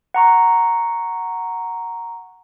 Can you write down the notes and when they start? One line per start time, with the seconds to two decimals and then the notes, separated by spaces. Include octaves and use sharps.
0.14 F#5 A#5 C#6